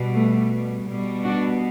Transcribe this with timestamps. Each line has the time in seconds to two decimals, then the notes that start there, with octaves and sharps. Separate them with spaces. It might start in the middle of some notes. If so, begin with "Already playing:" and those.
Already playing: B2 G3
0.14 A3
0.87 B2 G3
1.24 D4 F#4